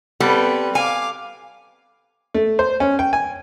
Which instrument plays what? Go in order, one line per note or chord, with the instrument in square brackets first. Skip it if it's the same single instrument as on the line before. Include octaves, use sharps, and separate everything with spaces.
[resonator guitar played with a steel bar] G3 B3 A4 [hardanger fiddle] C4 B4
[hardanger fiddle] F5 D6 [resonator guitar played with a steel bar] G#5
[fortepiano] A3
C5
C#4
G5
G#5